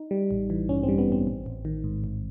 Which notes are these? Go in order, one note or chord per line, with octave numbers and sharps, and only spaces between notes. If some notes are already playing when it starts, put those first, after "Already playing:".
Already playing: D#4
G3
A1
E3
G2 C#4
C4
G3
B3
A1 C4
A1
A1
D#3
G#2
A1